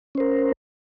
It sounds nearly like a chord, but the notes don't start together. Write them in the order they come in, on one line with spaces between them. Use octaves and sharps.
C#4 C5 A#4